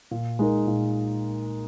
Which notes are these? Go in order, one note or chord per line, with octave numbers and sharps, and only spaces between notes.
A#2
G#3 D#4 A#4
A#2